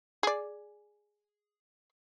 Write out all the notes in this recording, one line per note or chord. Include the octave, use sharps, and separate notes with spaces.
G#4 D5